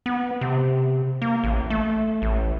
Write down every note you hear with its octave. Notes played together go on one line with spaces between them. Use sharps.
B3
C3
A#3
A1
A3
A1